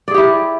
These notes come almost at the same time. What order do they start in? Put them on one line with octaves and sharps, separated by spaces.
D5 G#4 G4 E4